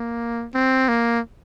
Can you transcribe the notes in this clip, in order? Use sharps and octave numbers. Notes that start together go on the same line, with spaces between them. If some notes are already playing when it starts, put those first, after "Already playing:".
Already playing: A#3
C4
A#3